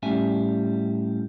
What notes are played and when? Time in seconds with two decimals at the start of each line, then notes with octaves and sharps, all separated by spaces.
0.03 A2 G3 C#4 E5 G#5